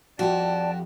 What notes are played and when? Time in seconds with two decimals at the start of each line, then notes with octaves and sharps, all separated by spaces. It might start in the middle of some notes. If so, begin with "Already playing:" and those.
0.19 F2 F#4 G4 D5 G5 A5